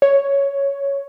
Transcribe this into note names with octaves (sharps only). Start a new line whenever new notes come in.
C#5